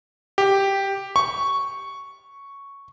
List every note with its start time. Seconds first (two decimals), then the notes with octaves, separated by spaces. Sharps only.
0.38 G4
1.16 C#6